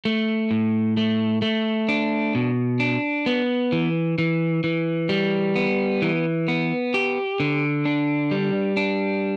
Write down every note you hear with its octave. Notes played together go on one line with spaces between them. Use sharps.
A3
A2
A3
A3
D4
B2
D4
B3
E3
E3
E3
G3
B3
E3
B3
G4
D3
D4
G3
D4